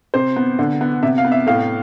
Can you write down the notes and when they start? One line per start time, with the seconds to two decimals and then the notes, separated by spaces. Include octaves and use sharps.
0.14 C3 C5
0.36 B3
0.59 D3
0.81 B3
1.03 C3 E5
1.18 F5
1.25 B3
1.32 E5
1.47 A2 F5